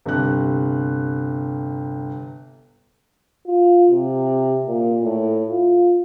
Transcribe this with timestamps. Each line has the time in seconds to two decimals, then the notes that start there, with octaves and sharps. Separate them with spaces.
0.06 G1 C3 F#6
3.46 F4
3.90 C3
4.66 A#2
5.02 A2
5.49 F4